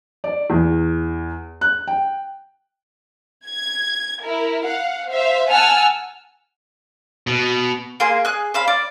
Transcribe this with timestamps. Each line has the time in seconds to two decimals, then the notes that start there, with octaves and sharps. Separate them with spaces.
0.24 D5
0.50 E2
1.61 F#6
1.87 G5
3.46 G#6
4.23 E4 A#4
4.65 F5 F#5
5.09 C5 E5 F5
5.50 F#5 G#5 A5 E6 F6
7.27 B2
8.00 A#3 G#4 C6
8.25 G#4 F#6
8.54 C5 F5 B5
8.68 D5